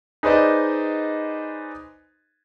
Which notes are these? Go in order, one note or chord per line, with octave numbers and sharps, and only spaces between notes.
D#4 G#4 B4 C5 D5 D#5